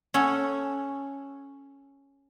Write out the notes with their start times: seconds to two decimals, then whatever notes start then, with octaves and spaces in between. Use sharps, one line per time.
0.14 C#4 A4 F#5